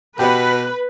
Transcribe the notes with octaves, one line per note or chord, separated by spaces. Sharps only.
B2 B3 G4 B4